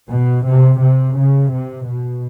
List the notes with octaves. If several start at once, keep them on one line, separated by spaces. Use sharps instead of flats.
B2
C3
C3
C#3
C3
B2